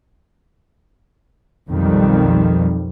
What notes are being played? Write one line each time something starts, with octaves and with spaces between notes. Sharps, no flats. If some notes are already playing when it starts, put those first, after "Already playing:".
B1 F2 D#3 G3